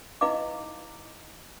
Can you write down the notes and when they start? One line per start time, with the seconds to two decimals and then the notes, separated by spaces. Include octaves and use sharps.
0.21 D#4 E4 B4 D#5 F5 D6